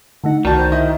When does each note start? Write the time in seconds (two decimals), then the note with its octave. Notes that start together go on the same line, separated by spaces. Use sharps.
0.24 D3 A3 D#4 F#5
0.45 C2 D#3 F#4 D5 A5 G6
0.57 C5
0.72 E4 D#5